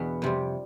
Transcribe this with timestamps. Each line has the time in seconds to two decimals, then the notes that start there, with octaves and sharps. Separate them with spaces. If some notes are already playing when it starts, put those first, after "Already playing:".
Already playing: E2 B2 B3 D4
0.22 F2 C3 G3